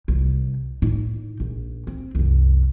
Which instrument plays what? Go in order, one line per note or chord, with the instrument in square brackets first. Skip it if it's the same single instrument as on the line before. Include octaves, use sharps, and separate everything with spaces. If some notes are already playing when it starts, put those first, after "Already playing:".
[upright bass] C2
A2 D#4
A#1
C4
C2 F#2